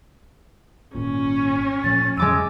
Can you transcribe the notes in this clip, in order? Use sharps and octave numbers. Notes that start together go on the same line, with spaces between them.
G#1 A#2 C#4
A#2 F3 A3 A6
F2 G#3 D6 E6 D#7